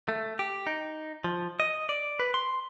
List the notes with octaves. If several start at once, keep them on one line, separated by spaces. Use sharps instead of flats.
A3
G4
D#4
F3
D#5
D5
B4
C6